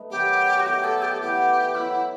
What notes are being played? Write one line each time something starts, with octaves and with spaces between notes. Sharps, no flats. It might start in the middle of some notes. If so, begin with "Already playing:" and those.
Already playing: A3 D#4 B4
D#3 F#3 B3 G4
F#4
B2 A3 D#4 G4
A4
G4
A4
E3 B3 F#4 G4
F#3 B3 D#4 E4